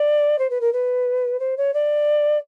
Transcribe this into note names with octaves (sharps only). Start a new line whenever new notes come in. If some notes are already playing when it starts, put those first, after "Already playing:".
Already playing: D5
C5
B4
A#4
B4
C5
C#5
D5